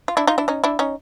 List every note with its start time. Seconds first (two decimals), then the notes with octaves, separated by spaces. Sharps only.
0.08 F4
0.17 D4 E4
0.27 D#4 F4
0.38 D4 E4
0.48 C#4 D#4
0.64 D4 E4
0.79 C#4 D#4